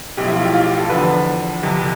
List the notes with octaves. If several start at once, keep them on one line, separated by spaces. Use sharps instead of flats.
B1 A2 F3 G4
E4
F4
G4
F4
G4
A4
E2 D3 F3 B4
G1 F2 C3